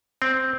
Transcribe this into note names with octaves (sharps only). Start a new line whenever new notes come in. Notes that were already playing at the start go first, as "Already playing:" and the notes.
C4